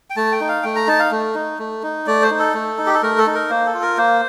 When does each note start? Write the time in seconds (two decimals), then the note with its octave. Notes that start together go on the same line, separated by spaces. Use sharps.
0.10 G5
0.16 A3 A5
0.32 G5
0.40 D#4
0.48 F5
0.63 A3 G5
0.76 A#5
0.87 D#4 A5
1.00 F5
1.11 A3
1.35 D#4
1.59 A3
1.83 D#4
2.07 A3 D5
2.22 C5
2.31 D#4
2.39 A4
2.54 A3
2.78 D#4
2.86 G4
2.94 A4
3.03 A3 A#4
3.18 A4
3.27 D#4
3.34 A#4
3.49 A#3 C5
3.66 A4
3.74 F4
3.82 A#4
3.97 A#3 C5